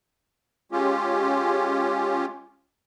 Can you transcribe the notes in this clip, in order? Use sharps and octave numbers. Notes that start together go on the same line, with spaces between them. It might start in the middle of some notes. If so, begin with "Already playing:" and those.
G#3 C#4 F4 G4